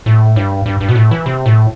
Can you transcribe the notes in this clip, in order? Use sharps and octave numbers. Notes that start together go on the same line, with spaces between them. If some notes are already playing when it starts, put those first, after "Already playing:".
A2
G2
G2
G2
B2
A2
E3
C3
A2